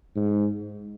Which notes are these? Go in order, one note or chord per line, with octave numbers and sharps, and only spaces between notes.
G#2